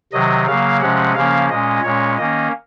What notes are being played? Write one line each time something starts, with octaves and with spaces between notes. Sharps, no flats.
C3 D#3 F#3 D#5
C#3 F#3 A#3 F5
C3 F3 G#3 C#4 F#5
C#3 F3 A#3 C#4 F5
A#2 G#3 C#4 D#5
A#2 G#3 C#4 C#5
D#3 A#3 C#4 D#5